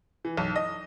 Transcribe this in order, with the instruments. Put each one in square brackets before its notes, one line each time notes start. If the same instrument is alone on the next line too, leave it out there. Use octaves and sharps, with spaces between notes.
[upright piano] E3
B1
D#5